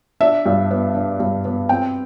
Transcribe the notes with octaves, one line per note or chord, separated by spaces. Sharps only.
D4 E5
G2
B3
D4
G2
B3
C4 G5